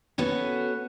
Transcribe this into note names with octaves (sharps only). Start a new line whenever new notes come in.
B3 C#4 F#4 A4